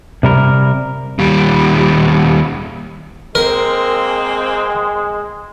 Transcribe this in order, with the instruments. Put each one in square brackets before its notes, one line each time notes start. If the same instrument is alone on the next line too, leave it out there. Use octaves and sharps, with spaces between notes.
[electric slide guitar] C3 G3 A#4
[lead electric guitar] D#2 G3
[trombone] G#3 [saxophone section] A#3 C4 [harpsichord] A#4